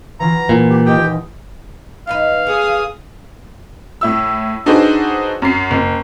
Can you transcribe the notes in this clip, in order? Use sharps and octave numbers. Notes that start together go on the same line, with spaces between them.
E3 F#3 F4 A#5
A#2 E4
G4
D#1 G4 D#5 G5 D#6
E2 D#4 B4 F5
B3 G#4 D#6
A2 E4 E6
D4 D#4 F#4 G#4 B4 C5
F#2 C7
F#1